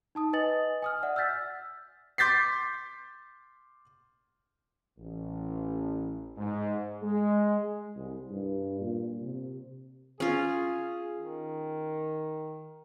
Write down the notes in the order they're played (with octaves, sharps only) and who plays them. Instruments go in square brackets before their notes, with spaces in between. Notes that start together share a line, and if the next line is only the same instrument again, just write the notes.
[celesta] D#4 A5 D#6
B4 D#5 G#5 D#6 A6 F#7
G#5 D#6 F6
D5 E5 F#5
E6 F6 G6 A6 B6
[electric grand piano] C6 D6 G6 A6 B6 C7
[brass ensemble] A1
G#2
G#3
[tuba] C2
G2
A#2
C3
[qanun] C#4 F4 [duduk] G#4
[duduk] D#3